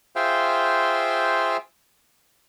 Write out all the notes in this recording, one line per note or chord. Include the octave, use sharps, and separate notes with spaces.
F4 G#4 C5 E5 F5 G5